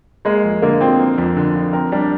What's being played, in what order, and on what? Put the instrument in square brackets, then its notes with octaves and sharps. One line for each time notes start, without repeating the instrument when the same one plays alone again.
[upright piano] G#3 [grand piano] A#3
[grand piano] F2
[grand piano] D3 [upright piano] A#3
[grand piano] F3 [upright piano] C4
[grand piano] A#3
F2
D3
F3
[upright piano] C4 [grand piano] A#4
[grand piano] G3 [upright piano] D4